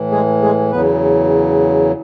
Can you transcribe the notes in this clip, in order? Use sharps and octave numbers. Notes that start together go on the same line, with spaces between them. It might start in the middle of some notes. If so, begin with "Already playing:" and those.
Already playing: A2 E3
G#3 G#4
G#3 G#4
E2 C#3 F#3 B3 B4